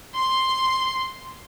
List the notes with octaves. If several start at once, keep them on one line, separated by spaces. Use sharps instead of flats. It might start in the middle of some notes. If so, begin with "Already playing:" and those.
C6